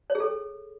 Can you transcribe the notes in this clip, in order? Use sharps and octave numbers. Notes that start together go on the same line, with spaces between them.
C#5
G#4
A4